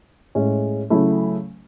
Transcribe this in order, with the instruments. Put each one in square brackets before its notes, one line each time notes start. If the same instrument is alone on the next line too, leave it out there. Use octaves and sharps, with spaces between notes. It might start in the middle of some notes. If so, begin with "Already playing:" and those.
[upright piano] A2 G#3 C#4
C#3 F#3 A3 E4